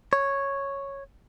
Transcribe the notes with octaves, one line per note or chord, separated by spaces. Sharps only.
C#5